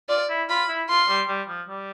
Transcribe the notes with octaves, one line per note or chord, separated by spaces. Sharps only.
F4 D5
E4
F4 B5
E4
F4 C6
G3
G3
F3
G3